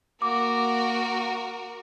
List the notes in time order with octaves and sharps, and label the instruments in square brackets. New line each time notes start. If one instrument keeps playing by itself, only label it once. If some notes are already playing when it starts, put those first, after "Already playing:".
[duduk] A#3 [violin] F#4 A#4 [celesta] D6